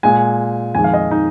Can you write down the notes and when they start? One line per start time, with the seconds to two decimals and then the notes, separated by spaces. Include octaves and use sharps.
0.03 A#2 G#3 G#5
0.75 F2 D#3 G#3 G#5
0.84 F5
0.93 D#5
1.11 D#4